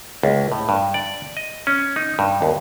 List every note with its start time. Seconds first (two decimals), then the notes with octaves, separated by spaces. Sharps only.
0.23 C#2
0.52 A2
0.69 G2
0.94 D5
1.37 D#5
1.67 C#4
1.96 D#4
2.19 G2
2.42 D#2